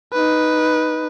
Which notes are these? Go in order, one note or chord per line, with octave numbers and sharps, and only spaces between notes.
D#4 B4